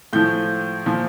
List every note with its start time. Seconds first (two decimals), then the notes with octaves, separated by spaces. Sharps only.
0.13 A2 F3 G6
0.86 A#2 F3